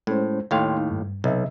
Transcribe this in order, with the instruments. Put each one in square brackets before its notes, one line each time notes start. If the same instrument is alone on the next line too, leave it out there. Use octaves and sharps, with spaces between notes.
[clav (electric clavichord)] A2 [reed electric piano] G#3 C#4 C5
[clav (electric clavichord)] D#2 A2 F5 [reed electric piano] C#5 G5 C6
[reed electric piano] D#4
G2
[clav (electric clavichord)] B1 [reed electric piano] C3 D#5 E5